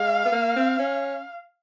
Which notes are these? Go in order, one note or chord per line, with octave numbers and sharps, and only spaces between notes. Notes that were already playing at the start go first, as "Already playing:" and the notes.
Already playing: G#3 F5
B3
A#3
C4
C#4